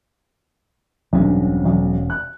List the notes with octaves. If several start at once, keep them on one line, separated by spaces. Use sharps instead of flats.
E1 B1 G2 C4 C#4
B1
F#6